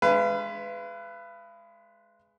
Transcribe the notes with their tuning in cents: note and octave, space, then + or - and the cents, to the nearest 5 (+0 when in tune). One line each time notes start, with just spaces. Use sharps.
G#3 +5 B4 +15 F5 -40